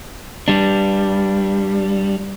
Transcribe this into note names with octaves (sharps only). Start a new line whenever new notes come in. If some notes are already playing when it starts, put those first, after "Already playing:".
G3 D4